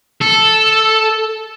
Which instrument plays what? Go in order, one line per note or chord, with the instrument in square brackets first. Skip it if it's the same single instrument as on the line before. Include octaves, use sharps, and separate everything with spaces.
[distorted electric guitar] A4